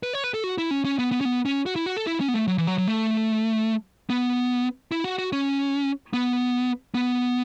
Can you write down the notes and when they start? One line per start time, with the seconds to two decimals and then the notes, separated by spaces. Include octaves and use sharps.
0.03 B4
0.14 C#5
0.24 B4
0.34 A4
0.44 F#4
0.58 E4
0.71 C#4
0.85 C#4
0.99 B3
1.12 B3
1.21 C#4
1.25 B3
1.46 C#4
1.66 F#4
1.76 E4
1.86 F#4
1.97 A4
2.07 E4
2.21 C#4
2.28 B3
2.34 A3
2.48 F#3
2.58 E3
2.67 F#3
2.78 F#3
2.88 A3
4.10 B3
4.92 E4
5.04 F#4
5.18 F#4
5.32 C#4
6.13 B3
6.95 B3